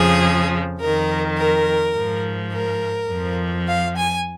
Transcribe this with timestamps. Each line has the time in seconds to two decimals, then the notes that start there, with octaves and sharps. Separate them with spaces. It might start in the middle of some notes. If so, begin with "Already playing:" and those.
Already playing: F2 C#3 F3 G#4
0.80 F2 D#3 A#4
1.38 A#4
1.95 G#2 F3
2.53 A#4
3.10 F2 F3
3.68 F5
3.96 G#5